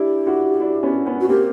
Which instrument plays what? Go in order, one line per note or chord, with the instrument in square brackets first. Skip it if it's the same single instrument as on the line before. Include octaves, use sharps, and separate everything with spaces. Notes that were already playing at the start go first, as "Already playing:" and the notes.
Already playing: [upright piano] D4 E4 [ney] G4
[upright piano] E4 F#4
D4 E4
B3 C#4
B3 C#4
[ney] F#4
[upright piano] A#3 C4 [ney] G4